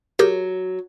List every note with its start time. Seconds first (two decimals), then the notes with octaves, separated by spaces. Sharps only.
0.19 F#3 G4 G#4 A#4